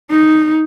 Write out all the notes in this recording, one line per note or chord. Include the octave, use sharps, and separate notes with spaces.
D#4